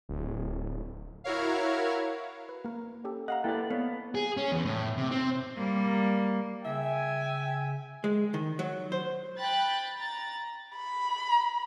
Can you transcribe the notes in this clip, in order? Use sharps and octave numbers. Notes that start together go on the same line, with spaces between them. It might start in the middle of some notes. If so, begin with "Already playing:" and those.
D1
E4 F#4 A#4 C#5 F5
B4
A#3 A#4
C#4 G4 A4
D#5 F5 F#5 A#5
A#3 E4 A4 B4 D5 G5
B3 C#5 F5
G#4
C#4
E2
A2
C3
C4
G3 A#3
C#3 E5 G5 G#5
G#3
D#3
F#3
C5
G5 B5 F#6 A6
A#5 A6
B5